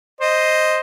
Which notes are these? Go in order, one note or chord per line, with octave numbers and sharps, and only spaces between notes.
C5 D#5